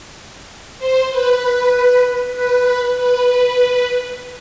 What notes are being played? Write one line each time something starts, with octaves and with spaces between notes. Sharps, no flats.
C5
B4
B4
B4